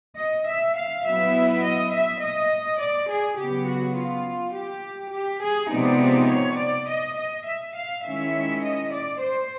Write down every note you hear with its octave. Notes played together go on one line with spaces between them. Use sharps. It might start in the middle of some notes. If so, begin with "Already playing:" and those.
D#5
E5
F5
F#3 B3 E4 E5
D#5
E5
D#5
D5
G#4
C#3 F#3 B3 G4
F#4
F4
G4
G4
G#4
C3 F3 G#3 B3 D#4 D5
C#5
D5
D#5
D#5
E5
F5
D#3 G#3 C#4 E4 E5
D#5
D5
C5